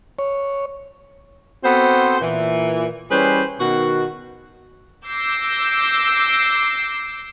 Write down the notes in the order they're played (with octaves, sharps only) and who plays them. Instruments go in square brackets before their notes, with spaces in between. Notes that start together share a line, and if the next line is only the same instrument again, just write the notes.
[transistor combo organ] C#5
[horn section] B3 C4 F#4 A4 C5
A#2 E3
E3 G3 C#4 G#4 B4 C5
B2 D#3 F#4
[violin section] D6 E6 G6 A#6 C7